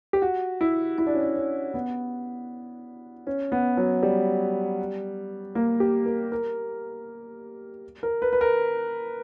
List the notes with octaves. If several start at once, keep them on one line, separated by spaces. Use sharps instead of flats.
G4
F#4
E4
E4
D4
C#4
D4
C#4
B3
C#4
B3
F#3
G3
A#3
G4
A#4
A#4
A#4
B4
B4
A#4